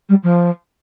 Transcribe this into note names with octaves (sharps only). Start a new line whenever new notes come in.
G3
F3